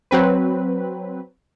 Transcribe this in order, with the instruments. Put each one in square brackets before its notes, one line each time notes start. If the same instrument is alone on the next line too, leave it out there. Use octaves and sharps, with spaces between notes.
[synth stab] F#3 C4 B4